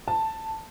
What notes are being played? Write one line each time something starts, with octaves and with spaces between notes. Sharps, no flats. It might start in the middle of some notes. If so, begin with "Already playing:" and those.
A5